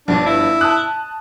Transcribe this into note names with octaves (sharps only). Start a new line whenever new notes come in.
G1 G2 F3 D4
E4
A5 D#6 F#6